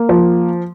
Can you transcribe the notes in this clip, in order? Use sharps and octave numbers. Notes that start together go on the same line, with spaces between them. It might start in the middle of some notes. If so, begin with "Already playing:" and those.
Already playing: A#3
F3